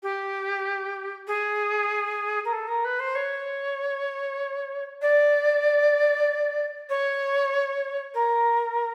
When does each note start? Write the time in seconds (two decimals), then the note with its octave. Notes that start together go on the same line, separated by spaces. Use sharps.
0.03 G4
1.27 G#4
2.45 A#4
2.52 A4
2.68 A#4
2.84 B4
2.99 C5
3.15 C#5
5.01 D5
6.89 C#5
8.14 A#4